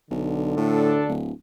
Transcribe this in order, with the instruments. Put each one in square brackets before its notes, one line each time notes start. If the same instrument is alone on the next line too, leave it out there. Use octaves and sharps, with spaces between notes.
[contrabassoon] B1 [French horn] D3
[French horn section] D2 D4 A4 [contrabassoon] A2
[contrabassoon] D1